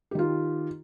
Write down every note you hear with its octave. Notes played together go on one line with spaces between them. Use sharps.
D#3 F4 G4